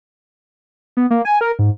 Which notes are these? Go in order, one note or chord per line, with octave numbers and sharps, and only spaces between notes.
B3
A#3
G#5
A#4
G#2